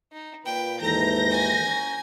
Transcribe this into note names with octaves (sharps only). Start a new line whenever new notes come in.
D#4
A#2 B4 G5
D#2 G#2 E3 A4 A#5 G6 A#6
E4 F#4 G4 G#5
C#4 A#4